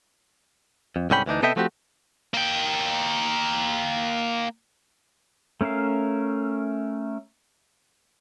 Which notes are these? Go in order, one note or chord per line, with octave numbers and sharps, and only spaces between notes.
F2
C2 G#2 D3 C#4 G5 B5
D2 E3 D4 D#4
C3 B3 A4 D#5 E5 G5
F3 A3 C4 F#4 G4
A#3 G5
A3 C#4 A#4 E5 F5